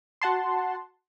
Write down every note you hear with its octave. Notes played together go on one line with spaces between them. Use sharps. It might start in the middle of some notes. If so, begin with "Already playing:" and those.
F#4 F#5 A5 C6